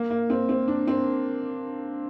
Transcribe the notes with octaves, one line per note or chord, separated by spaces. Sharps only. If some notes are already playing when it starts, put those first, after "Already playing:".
Already playing: A#3
A#3
C4
C4
D4
C4